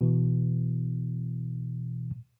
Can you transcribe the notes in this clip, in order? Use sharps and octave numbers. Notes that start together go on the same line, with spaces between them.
B2 E3